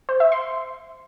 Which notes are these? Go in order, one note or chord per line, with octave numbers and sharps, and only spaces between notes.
C5
E5
C6